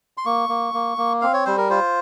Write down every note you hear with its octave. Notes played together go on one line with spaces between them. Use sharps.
C6
A#3 C#6
A#3
A#3
A#3
C4 F5
C#5
G3 C5
A#4
F4 C5